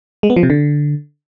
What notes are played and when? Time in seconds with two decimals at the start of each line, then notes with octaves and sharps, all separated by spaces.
0.23 G#3
0.30 B3
0.36 F3
0.43 C3
0.50 D3